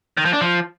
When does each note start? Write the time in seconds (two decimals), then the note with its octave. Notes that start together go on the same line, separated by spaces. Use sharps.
0.17 D#3
0.25 F3
0.33 D4
0.41 F3